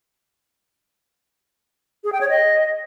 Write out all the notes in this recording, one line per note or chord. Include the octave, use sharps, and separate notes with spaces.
G#4
G5
C#5
D#5